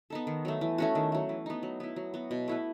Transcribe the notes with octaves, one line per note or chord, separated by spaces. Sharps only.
B3 D#4 A4
D#3
F#3 A3
E3
A3 C#4 F#4
D#3
F#3 A3
E3
B3 D#4
F#3
B3 E4
F#3
B3 F#4
B2
A3 E4 B4